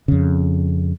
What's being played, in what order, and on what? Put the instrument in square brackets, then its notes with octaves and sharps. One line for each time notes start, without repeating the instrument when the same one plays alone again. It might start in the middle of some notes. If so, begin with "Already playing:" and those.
[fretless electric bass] F2 C#3